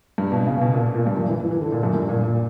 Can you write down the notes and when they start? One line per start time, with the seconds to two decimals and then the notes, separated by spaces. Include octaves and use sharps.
0.18 G2
0.32 B2
0.47 C#3
0.61 B2
0.73 A#2
0.95 A#2
1.06 G2
1.17 F#2
1.28 E3
1.40 E3
1.51 E3
1.61 D3
1.72 A#2
1.83 F#2
1.95 G2
2.09 A#2
2.23 A#2